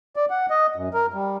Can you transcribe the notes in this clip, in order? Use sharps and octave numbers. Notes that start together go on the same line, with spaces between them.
D5
F#5
D#5
F#2
A#4
G3